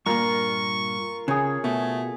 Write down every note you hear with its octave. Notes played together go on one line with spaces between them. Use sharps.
G2 A#2 F4 A#4 C#6
C#3 G#4 C#5
B2 A3